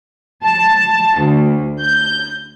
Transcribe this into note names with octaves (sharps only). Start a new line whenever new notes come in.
A5
D2
G6